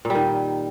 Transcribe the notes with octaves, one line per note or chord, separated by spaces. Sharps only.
A#2
G3
D#3